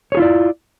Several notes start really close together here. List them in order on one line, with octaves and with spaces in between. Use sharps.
C#5 G#4 F4 E4 D5